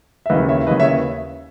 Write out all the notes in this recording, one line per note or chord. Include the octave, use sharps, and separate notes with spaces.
E5
D#2 C#3 E3 B4 D#5
C#5 E5
D#2 C#3 E3 B4 D#5
C#5 E5